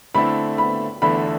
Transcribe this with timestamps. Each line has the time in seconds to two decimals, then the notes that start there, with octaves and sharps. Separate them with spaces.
0.15 D3 A3 C4 E4 B5
0.58 B5
1.02 E2 D3 A3 E4 B5